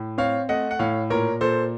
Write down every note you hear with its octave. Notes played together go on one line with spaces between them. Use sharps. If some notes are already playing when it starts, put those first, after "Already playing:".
Already playing: A2
C4 C#5 F5
A3 D#5 F#5
F#5
A2 C#5 F5
A#2 A#4 C#5
A#2 A4 C5